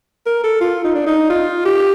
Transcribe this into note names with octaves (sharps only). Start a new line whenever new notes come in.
A#4
A4
F4
D#4
D4
D#4
F4
G4